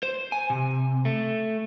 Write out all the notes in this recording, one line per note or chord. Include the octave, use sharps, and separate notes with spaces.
C5
G#5
C3
A3